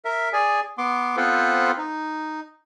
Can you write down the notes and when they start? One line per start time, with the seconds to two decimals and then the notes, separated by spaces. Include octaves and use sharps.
0.05 A#4 E5
0.33 G#4 D5 G#5
0.78 B3 C6 D6
1.17 B3 C4 F4 A4 B4 C5
1.78 D#4